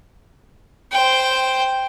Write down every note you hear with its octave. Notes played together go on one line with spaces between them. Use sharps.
C5 G5